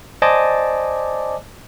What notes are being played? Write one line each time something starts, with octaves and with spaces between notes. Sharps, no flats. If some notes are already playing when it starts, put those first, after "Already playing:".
C5 D5 D#5 G#5 A5 D6